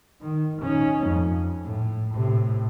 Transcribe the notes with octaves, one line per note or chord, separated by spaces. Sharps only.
D#3
C#4 D#4
F2
A2
A2 C3